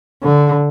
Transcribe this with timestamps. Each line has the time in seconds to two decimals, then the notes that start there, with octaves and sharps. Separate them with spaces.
0.23 D3